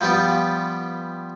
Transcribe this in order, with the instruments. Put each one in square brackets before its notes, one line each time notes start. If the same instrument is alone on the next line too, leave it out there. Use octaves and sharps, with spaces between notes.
[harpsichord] F3 G3 B3 F4 G4